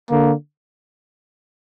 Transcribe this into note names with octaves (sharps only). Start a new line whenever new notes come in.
D3 A#3